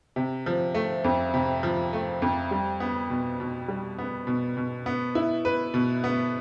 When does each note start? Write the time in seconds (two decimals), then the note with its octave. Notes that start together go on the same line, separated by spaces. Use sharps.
0.16 C3
0.46 F3
0.74 A3
1.04 F2
1.34 C3
1.63 F3
1.93 A3
2.22 F2
2.51 G3
2.80 B3
3.10 B2
3.40 B2
3.68 G3
3.98 B3
4.27 B2
4.57 B2
4.86 B3
5.15 E4
5.45 B4
5.74 B2
6.04 B3